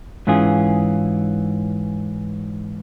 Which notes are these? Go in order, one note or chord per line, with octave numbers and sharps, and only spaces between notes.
G#2 E3 C#4 F4 G#4